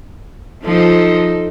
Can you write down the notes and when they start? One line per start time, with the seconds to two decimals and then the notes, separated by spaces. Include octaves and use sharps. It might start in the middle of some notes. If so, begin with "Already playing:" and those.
0.64 F3 D#4 A4